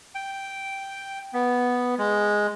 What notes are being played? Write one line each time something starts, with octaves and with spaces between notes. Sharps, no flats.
G5
B3
G#3